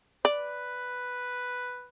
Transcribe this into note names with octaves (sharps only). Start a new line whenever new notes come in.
B4 D5